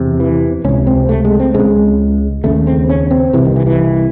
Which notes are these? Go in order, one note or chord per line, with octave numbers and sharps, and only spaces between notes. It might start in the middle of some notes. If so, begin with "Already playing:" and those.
Already playing: E2 C3
E3
C#2 C3 C#4
C4
A3
G#3
C4
C#2 C#3 G#3
D#2 C#3 A3
C4
C#4
C4
C2 C3 E3
D#3
E3
E3